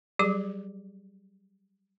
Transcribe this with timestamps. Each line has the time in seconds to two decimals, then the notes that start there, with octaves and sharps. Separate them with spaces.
0.19 F#3 G3 G4 G#4 D6